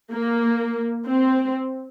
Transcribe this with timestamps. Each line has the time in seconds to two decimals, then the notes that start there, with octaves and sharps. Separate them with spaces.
0.12 A#3
1.06 C4